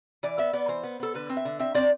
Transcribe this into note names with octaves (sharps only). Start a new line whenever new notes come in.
E3 D5
B3 E5
B3 D5
E3 C5
B3
B3 A4
D3 B4
C4
E5
D3
C4 E5
C4 D5